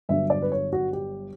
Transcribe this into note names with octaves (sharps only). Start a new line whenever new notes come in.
G1 G2 D3 F#3 E5
D5
B4
C#5
F#4
G4